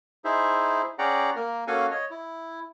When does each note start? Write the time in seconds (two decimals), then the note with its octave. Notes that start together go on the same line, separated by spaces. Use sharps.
0.25 D#4 E4 G#4 C5 E5
0.99 C#4 G#4 D5 F#5 G5 A#5
1.36 A#3 A#4
1.67 A#3 C#4 F#4 A4 F5 G#5
1.91 C#5 D#5
2.10 E4